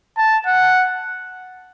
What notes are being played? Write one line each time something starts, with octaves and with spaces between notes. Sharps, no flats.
A5
F#5